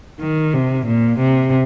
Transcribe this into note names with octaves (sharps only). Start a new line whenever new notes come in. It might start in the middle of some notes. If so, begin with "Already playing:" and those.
D#3
C3
A#2
C3